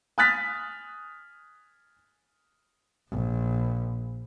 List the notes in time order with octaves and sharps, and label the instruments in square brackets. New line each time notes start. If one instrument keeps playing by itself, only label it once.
[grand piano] G#5 D#6 F6 F#6 A6 B6
[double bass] A#1